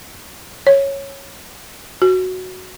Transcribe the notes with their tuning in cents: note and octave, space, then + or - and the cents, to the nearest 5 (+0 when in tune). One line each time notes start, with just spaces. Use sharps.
C#5 -10
F#4 +0